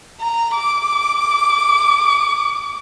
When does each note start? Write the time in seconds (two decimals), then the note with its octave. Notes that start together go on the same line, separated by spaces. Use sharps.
0.21 A#5
0.56 D6